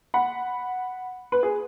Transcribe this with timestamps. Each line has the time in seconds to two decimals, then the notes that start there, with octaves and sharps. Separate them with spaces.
0.14 F#5 B5
1.32 B4
1.43 G#4